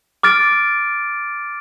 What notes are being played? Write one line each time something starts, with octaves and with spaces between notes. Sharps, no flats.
D6 F6 A6 D7